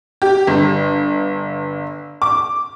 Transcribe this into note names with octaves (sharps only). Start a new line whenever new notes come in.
G4
G1
D6